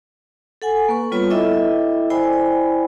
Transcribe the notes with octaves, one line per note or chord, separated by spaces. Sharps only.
A4 F#5 G#5
A#3 B4 C#6
G3 B3 F4 B4 C#5 B5
E4 A4 D#5 E5 G5 D6
E4 C5 D5 G5 G#5 B5